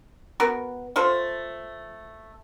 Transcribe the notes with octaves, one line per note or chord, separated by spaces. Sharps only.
B3 F#4 A#4
A3 F4 A4 C5